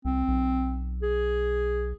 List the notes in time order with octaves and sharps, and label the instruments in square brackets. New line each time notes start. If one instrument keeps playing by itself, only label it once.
[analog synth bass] C2 [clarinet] C4
[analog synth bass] B1
[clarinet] G#4